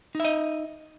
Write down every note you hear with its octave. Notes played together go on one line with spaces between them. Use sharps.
D#4 D#5 E5